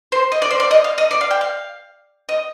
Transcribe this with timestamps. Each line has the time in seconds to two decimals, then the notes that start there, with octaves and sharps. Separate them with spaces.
0.12 C5
0.32 D#5
0.42 D5
0.51 C5
0.60 D5
0.71 D#5
0.84 F5
0.98 D#5
1.11 D5
1.21 F5
1.31 G5
1.41 F5
2.29 D#5